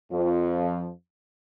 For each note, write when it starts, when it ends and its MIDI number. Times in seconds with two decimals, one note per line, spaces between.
0.12 0.90 41
0.12 0.90 53